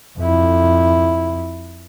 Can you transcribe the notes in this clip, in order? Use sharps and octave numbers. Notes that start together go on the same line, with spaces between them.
F2 E4